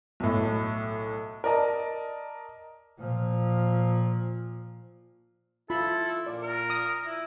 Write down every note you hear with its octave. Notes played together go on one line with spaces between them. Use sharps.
B1 A2
A#4 D5 D#5 A5
A#2 F3
E4 F4 A4 B5
A#2 D5
A#4
D#6
E4